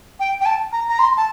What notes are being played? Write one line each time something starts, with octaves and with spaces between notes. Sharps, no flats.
G5
G5
A5
A#5
A#5
C6
A5